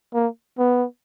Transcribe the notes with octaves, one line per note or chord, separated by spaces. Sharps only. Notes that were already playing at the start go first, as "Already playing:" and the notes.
A#3
B3